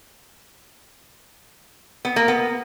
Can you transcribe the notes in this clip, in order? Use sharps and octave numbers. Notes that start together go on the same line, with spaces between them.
B3
A#3
B3